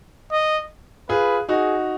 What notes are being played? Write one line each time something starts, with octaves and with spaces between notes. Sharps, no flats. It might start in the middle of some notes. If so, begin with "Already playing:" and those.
D#5
F4 G#4 B4
D#4 F#4 G#4